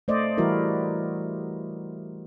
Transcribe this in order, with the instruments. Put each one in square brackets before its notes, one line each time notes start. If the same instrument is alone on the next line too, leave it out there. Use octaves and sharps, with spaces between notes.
[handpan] A3 C5 D5 D#5
E3 G3 E4 F#4 A#4